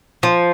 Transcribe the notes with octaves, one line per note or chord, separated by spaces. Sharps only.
F3